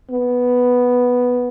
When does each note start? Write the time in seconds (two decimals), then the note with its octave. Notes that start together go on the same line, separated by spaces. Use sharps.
0.10 B3